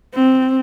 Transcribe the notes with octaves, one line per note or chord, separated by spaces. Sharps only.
C4